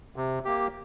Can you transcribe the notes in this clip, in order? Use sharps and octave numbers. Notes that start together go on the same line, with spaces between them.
C3
A#3 G4